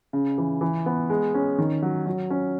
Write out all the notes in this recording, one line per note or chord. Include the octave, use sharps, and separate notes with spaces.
C#3
E3
E3
B3
G#3
C#4
D#3
F#3
F#3
C#4